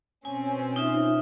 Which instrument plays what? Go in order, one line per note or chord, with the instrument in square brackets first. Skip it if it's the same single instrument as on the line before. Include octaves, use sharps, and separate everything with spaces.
[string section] B2 C4 C#4 [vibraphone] G#5
[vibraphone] D#4 F4 E5